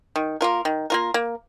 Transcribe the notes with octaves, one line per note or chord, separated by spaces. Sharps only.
D#3
A#3 F4 A#4
D#3
A#3 F4 A#4
A#3